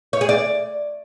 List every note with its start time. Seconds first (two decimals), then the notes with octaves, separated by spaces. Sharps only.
0.13 C#5
0.21 G#4
0.29 D5